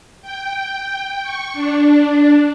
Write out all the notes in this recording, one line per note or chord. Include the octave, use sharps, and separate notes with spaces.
G5
C#6
D4